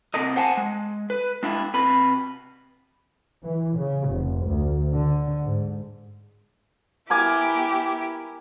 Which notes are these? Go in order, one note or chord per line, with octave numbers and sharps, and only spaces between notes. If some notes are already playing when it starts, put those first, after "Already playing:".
C3 A#4 D#5
C5 F#5 G#5 A5
G#3
B4
G#3 D4 E4
C3 B4 B5
E3
C#3
F1
D2
D3
G#2
B3 E4 G4 A#4 G#5 D6